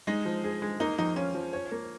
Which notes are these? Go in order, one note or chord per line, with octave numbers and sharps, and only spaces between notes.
G#3 D#4
F3
G#4
G#3
A#3 D#4
F2 D#4
C#4 F4
F3
C#5
A#3